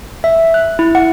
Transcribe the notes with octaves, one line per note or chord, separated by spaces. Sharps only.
E5
F#6
E4
F#5